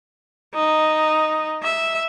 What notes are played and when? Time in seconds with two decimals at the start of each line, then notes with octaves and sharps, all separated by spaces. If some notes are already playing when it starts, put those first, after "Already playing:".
0.55 D#4
1.63 E5